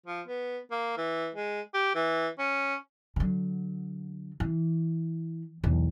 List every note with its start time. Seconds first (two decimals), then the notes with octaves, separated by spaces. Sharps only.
0.06 F3
0.27 B3
0.71 A#3
0.97 E3
1.35 G#3
1.74 G4
1.95 E3
2.39 C#4
3.16 D3 F#3
4.40 E3
5.64 B1 E2